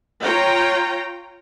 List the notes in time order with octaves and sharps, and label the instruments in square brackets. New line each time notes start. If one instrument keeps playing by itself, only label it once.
[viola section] F4 C#5 G5 A#5